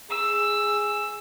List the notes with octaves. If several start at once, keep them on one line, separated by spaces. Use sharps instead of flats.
G#4 E6